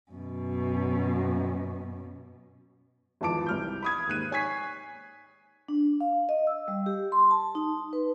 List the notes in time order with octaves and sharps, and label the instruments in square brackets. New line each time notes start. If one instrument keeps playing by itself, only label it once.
[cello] F#2 B2
[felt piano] G#1 E2 F3 A5 D6 D7
C2 F6 G6
B5 D#6 G#6
D#2 G#2 F#6 D#7
C#5 G#5 C#6 G#6 B6 C7
[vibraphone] D4
F5
D#5
E6
G3
G4
C6
A5
D#4
B4